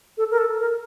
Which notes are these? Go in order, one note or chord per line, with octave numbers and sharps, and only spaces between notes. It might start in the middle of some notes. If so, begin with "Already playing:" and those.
A4
A#4
A4
A#4